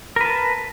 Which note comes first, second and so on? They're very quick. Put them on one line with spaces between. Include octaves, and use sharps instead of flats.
A#4 B4 A5